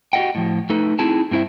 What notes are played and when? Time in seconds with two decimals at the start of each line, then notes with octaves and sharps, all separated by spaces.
0.13 F#4 G4 A4 D#5 F#5 G5
0.35 A2 F3
0.70 A3 D#4 A4 B4
0.99 C4 D#4 E4 G#4 A5
1.31 G2 C4 E4 C5 E5